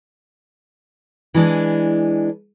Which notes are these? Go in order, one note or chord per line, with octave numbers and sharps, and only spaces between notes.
E3 G#3 D4